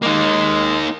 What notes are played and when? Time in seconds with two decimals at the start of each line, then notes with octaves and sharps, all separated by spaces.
0.02 G#3 A#3 D#4